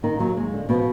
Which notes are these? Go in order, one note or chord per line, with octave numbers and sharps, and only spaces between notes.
D#2 D#3 D#4
D#2 F#3
D#2 G#3
D3
B2 F3 B3